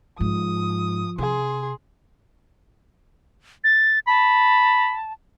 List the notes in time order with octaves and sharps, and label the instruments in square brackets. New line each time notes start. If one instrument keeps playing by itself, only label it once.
[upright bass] G#2 [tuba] F3 [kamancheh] D#6
[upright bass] C3 [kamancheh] G#4 C6
[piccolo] A6
[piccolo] A5 [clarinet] B5